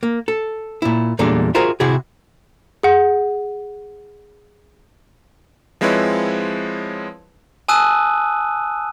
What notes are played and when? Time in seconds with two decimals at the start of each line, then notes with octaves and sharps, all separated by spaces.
0.03 A#3
0.28 A4
0.82 A#2 E4
1.19 E2 A#2 G3 G#3 D4 A4
1.55 F4 F#4 G#4 A#4 C5 E5
1.80 C3 C4 E4 F#4 G#4
2.83 G#4 F#5
5.81 F3 G#3 C4 E4 B4 C#5
7.68 G#5 A5 D#6 E6 F#6 D#7